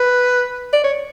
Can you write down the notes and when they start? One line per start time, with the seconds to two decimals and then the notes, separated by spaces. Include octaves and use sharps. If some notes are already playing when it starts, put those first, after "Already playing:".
Already playing: B4
0.73 D5
0.84 C#5